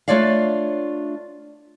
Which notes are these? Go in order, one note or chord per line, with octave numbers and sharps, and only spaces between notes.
A3 D4 F4 C#5 D5 F5